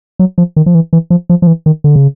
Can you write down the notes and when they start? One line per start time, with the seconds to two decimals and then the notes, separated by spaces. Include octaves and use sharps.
0.19 F#3
0.38 F3
0.56 D#3
0.66 F3
0.75 E3
0.93 E3
1.10 F3
1.30 F3
1.42 F3
1.47 E3
1.66 D#3
1.84 D3
1.96 C#3